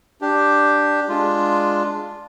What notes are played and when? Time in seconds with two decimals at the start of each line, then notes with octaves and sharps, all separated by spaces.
0.21 D4 G4
1.09 G#3 D4 F4